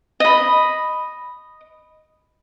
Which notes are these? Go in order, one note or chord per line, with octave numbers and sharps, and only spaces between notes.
D#5 B5